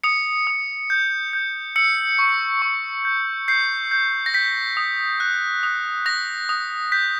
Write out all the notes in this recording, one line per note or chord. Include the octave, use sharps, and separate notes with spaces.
D#6 C#7
D#6
G6
G6
E6 C#7
C#6
C#6
G6
G6 C7
G6
A#6
G6 B6
D#6
F#6
D#6
D#6 A#6
D#6
G6 B6